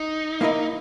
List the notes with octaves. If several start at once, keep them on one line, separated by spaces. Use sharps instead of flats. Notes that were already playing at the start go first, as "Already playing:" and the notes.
Already playing: D#4
A#3 E4 A#4 D#5